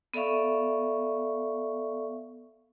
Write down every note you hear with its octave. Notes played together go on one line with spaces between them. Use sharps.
B3 A4 D5 E5 F5 C#6